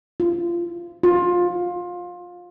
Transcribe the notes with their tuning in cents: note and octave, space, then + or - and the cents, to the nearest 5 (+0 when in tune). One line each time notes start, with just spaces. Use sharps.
F4 -25
F4 +20